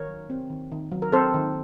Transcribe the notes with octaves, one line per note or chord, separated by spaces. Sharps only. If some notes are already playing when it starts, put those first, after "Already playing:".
Already playing: D#3 A#4 C#5
F#3
C4
D#3
D#3
F#3
A#4
C4 A4 C5
D#3